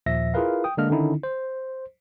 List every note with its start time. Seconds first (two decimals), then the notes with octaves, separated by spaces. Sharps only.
0.06 D#2 A#2 F3 E5 A#6
0.34 E4 F4 G#4 A#4 B4 F5
0.64 G5 D#6
0.77 D3 G#3 A#3 D4 D#5 F6
0.90 D3 D#3 C#4 D#4 E4
1.23 C5